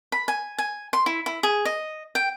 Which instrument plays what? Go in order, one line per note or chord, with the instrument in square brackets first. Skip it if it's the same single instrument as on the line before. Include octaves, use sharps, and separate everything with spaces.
[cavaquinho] B5
G#5
G#5
C6
E4
E4
G#4
D#5
G5